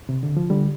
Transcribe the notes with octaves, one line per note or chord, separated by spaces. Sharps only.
C3
D3
F3
D3 G3